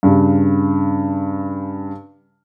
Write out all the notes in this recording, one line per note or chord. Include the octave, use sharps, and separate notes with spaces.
G2 C#3